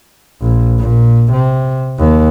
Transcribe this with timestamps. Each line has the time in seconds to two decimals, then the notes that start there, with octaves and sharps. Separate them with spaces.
0.41 A#1
0.80 A#2
1.33 C3
1.98 D#2